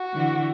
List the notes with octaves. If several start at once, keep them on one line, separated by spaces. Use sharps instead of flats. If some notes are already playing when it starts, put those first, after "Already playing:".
Already playing: F#4
D3 E3